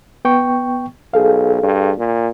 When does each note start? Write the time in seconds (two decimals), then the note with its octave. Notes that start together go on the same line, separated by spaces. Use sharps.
0.25 B3 G5 C#6
1.14 B1 G#4 A4 F5
1.63 G2
1.98 A#2